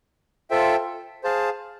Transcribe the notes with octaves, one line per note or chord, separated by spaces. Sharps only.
F4 A4 C5 E5 G5
G#4 C5 F5 A5